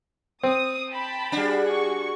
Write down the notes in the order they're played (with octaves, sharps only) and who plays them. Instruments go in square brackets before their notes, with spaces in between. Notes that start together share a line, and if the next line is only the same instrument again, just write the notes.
[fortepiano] C4 [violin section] D#6
[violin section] G5 A5 B5
[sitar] G3 D4 [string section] F#4 G#4
[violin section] C#6